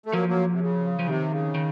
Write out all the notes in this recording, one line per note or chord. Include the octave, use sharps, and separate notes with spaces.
A3
F3 F#3 A#3
F#3 A#3
C3
C#3
F3
C3 D#3
C#3
D#3